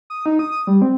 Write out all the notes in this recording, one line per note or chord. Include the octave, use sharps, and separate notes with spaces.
D#6
D#4
D#6
D#6
G3
C4